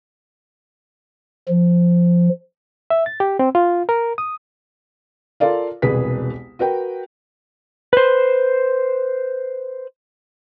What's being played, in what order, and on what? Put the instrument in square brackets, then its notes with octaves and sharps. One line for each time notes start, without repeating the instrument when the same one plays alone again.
[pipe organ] F3
[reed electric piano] E5
A6
G4
C4
F4
A#4
D#6
[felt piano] F4 A4 A#4 D5 F5
E1 C2 G#4 B4 B6
F#4 A#4 B4 G5
[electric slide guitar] B4 C5